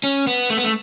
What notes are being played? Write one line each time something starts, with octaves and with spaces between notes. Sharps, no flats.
C#4
B3
A3
B3
A3